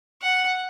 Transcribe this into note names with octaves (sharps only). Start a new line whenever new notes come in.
F#5